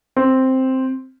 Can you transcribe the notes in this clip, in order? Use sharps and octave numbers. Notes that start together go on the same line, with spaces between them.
C4